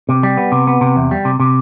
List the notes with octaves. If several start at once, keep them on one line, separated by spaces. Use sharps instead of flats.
C3
G3
B3
C3
B3
C3
E2
G3
C3
C3